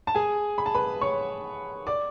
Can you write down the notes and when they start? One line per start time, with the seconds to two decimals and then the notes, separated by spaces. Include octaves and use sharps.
0.07 A5
0.15 G#4 G#5
0.58 B5
0.66 A5
0.74 B4 B5
1.01 C#5 C#6
1.87 D5 D6